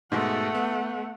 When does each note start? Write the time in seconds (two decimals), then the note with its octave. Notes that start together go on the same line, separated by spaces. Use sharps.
0.12 G#2 B2 G#3 A3 F#5
0.55 B3